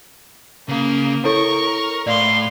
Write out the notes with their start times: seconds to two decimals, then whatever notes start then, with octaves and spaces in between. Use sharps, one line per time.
0.69 C#3 A#3
1.25 E4 A4 A#4 C#5 C#6
2.07 A2 D5 F5 C6